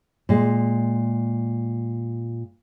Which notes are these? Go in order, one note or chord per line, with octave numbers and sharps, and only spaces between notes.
A#2 G#3